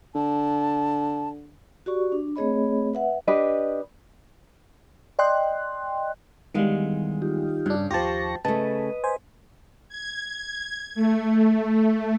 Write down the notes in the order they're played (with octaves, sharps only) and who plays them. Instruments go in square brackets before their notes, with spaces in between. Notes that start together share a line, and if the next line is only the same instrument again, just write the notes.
[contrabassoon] D3 [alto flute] A5
[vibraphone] F#4 G4 D5 C#6
D4
A3 C4 G#4 C#5 D#5 B5
B4 E5 F#5
[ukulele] D4 G4 B4 D#5
[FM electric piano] D5 D#5 G5 C6 F#6
[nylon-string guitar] E2 G#3 F5 [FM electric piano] D#3 G3
[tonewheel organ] D#4 F4 G4
[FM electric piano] G2 D4 [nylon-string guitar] C#3
[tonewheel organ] D#2 C#6 A#6 [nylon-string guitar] F3 F4 [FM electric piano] G4 A5
[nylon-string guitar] C#3 A3 [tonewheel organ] B4 D#5 [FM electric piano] A5
[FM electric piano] C5 G#5
[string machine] G#6
A3